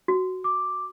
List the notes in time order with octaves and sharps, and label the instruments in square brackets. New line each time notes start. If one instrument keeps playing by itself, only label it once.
[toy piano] F#4
[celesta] D6